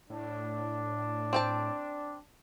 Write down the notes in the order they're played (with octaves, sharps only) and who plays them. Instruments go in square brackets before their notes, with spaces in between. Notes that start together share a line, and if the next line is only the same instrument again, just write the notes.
[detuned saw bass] A2 [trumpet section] D4
[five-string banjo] C4 G5 A5